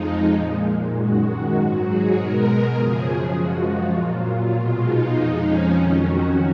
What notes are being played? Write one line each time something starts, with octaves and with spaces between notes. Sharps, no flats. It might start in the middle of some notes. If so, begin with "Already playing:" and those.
Already playing: F2 F3 G#3 D#4
A#2 G#3
F#2 D#3 G#3 F#4
G#2 F#3 F#4
G#4
B2 G#3 A#4
F#2 C#3 F3 G#4
F#2 F3 G#3 F#4
F4
A#2 F#3
F4
B2 G#3
D#4
F2 F3 G#3
C#4
F2 D#3 F#3
F#4